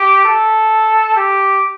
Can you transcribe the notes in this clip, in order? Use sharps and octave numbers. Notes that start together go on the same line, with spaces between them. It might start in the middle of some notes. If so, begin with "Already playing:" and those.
Already playing: G4
A4
G4